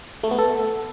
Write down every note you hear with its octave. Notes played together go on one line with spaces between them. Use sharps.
A3
B3
A4